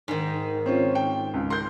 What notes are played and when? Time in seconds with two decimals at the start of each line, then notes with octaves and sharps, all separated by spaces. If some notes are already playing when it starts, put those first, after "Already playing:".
0.08 G#2 D#3
0.66 C4 C#4 F4
0.95 G5
1.34 C#2
1.50 A#4 C6 G6